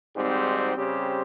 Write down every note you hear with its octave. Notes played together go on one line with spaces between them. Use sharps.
G#1 G#2 G3 C4
C#3 G3 C4 G4 C5